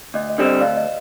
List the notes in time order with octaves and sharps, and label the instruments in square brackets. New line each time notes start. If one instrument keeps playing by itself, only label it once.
[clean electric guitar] D2 [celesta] D#5
[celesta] D#5
[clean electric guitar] D3 G3 C4
[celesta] D#5
[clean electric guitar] D2 [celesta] D5 F5
[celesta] D#5